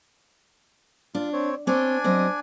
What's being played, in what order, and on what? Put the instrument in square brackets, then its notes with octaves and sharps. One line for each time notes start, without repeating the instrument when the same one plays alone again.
[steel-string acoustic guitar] D4 [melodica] F4
[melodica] C4 C#5
[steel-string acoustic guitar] C4 C#5 [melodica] D4 D5 G#5
[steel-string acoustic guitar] F#3 C4 D#5